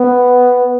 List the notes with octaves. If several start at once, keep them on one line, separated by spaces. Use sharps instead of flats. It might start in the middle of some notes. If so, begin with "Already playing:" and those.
Already playing: B3